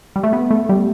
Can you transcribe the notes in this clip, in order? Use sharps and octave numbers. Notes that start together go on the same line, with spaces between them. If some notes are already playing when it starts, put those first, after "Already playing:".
G3
A3
B3
A3
G3